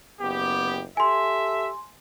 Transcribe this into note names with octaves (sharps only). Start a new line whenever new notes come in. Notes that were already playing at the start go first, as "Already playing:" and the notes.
F#1 B3 G4
G4 A4 E5 G#5 C6